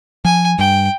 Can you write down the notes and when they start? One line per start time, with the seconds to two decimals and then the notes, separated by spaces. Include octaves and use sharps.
0.25 F3 G#5
0.59 G2 G5